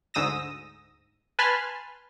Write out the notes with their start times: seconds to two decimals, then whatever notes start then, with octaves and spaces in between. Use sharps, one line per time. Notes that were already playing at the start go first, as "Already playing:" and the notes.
0.14 D2 G#2 D#6 E6 A#6
1.39 B4 G#5 A5 B5 C6 F6